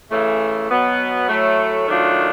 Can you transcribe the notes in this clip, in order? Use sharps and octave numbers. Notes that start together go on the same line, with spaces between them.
C#3 E3 A3
B2 F#3 B3
A2 F#3 A3
D#3 F#3 A3 D4 F4